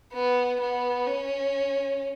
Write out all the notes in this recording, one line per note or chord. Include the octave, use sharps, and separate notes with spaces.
B3
B3
C#4